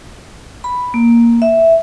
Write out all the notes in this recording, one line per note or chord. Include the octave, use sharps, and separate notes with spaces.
B5
A#3
E5